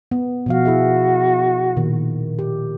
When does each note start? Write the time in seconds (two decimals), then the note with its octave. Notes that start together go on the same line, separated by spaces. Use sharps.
0.11 B3
0.46 B2 F3 F#4 F5
0.65 E4 G#4 E5
1.77 A#2 D#3
2.39 G4